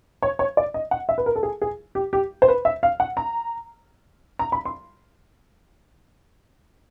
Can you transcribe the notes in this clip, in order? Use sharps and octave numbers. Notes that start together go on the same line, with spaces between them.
C#5
C#5
D5
D#5
F#5
E5
B4
A#4
A4
G#4
G#4
G4
G4
C5
B4
E5
F5
F#5
A#5
A#5
B5
C6